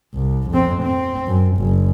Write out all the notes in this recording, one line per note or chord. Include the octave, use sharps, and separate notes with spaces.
C2
F2 C4
C4
F#2
F#1